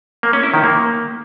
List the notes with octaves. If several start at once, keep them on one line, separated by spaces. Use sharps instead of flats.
A#3
C#4
E4
D#3
A#3